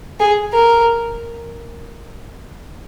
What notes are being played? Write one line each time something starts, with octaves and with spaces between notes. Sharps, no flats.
G#4
A#4